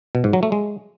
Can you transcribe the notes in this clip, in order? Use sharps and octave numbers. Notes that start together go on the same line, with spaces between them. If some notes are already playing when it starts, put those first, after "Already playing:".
B2
G#2
F#3
A3
G#3